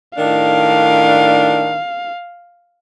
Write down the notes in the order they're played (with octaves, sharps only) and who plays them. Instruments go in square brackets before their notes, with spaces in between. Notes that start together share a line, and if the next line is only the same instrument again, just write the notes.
[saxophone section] A2 D#3 D4 [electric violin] F5